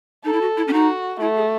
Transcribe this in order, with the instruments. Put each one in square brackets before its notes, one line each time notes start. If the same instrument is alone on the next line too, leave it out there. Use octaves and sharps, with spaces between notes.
[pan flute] D#4 [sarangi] A4
[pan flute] E4
F#4
E4
C#4
[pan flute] D#4 [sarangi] F#4
[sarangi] A3 [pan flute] E4
[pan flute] G#4